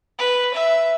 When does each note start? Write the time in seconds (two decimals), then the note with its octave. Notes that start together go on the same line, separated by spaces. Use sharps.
0.18 B4
0.54 E5